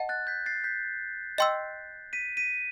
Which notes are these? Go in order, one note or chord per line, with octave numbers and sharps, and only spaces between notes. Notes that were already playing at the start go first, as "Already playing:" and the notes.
Already playing: D#5 F#5 A5
F#6 A6
G6 B6
A6 C7
G6 B6
D#5 G5 C6 E6
B6 D#7
B6 D#7